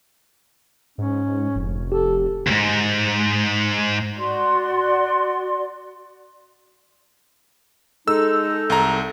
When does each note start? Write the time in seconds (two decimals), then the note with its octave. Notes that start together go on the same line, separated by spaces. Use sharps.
0.98 G#2 C#4
1.55 F1
1.92 G4 A4
2.47 C#2 G#2
4.17 F#4 D5 C6
8.08 G#3 D#4 A4 E6
8.70 C2 A#5